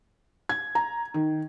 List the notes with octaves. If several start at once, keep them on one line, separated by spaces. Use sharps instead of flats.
G#6
A#5
D#3